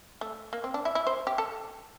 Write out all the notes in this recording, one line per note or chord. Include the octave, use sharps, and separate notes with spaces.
A3
A#3
C4
D4
E4
E4
C5
G4
A4